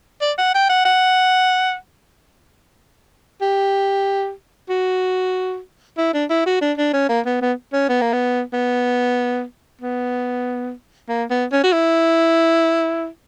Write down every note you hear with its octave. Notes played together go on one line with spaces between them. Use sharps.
D5
F#5
G5
F#5
F#5
G4
F#4
E4
D4
E4
F#4
D4
D4
C#4
A#3
B3
B3
C#4
B3
A#3
B3
B3
B3
A#3
B3
C#4
F#4
E4